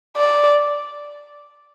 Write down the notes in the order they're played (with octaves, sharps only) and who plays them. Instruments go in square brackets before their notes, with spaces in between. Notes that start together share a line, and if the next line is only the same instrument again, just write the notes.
[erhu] D5